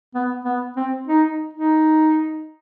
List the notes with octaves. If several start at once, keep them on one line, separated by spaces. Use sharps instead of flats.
B3
B3
C4
D#4
D#4